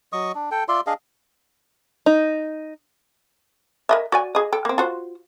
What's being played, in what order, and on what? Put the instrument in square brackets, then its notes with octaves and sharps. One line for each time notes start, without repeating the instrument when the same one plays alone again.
[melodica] F#3 D#5 C#6 D#6
D4
A4 G5
F4 D5 E5 C6
D4 G#4 D#5 F5
[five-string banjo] D#4
[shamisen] A#4 D#5 E5
F#4 D5 G#5
G#4 D#5
A4 G5
A#3 C4
F4 F#4 C5